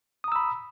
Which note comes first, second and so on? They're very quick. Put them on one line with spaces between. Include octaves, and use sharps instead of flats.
D#6 A#5 E6 B5